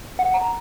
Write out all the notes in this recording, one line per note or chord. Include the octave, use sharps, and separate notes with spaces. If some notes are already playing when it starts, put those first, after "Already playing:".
F#5
A#5